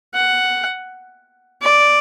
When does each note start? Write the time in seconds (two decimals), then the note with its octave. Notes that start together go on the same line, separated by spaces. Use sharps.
0.14 F#5
1.62 D5